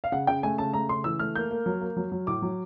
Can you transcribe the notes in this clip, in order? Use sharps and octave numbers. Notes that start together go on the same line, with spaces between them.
F5
C#3 F#5
C#3 G5
A3 G#5
C#3 A5
A3 A#5
C#3 C6
E3 E6
A3 F6
A#3 G6
A#3
F#3
A#3
F#3
F#3
A2 D6
F#3